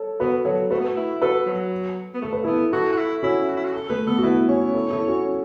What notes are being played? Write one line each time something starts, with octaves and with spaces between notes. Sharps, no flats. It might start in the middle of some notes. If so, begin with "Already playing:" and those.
Already playing: A4 C#5
B3 F#4 B4
F#3 A4 C#5
A3 F#4 B4
B3
A3
E4
F#4 A4 B4
F#3
B3
A3 A4
B4
B3 E4 A4
E4 F#4 A4
F#4
E4
C#4 E4 F#4
F#4
E4
F#4
A4
A3 B4
B3 A4
F#4
B3 E4 B4
C#4 F#4 C#5
E4 A4
E4 A4
C#4 F#4